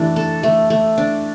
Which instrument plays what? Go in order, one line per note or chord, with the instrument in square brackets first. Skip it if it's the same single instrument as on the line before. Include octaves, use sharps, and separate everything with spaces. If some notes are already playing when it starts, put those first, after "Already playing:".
Already playing: [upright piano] E3 [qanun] A3 D4
[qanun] A4
A3
A3
D4